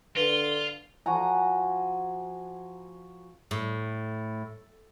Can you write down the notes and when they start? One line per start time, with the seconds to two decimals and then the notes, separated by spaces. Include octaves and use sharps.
0.17 D3 F4 B4 G7
1.06 F3 F#4 G#5 A#5
3.51 A2